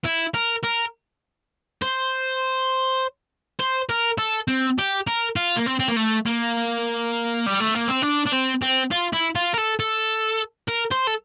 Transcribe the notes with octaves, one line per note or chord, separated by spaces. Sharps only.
E4
A#4
A#4
C5
C5
A#4
A4
C4
G4
A#4
F4
A#3
C4
C4
A#3
A3
A#3
G3
A3
A#3
C4
D4
D4
C4
C4
F4
E4
F4
A#4
A4
A4
A#4
C5
A4